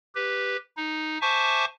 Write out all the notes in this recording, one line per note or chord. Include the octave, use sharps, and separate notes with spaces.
G4 B4
D#4
C5 E5 G#5 A5 C#6 D6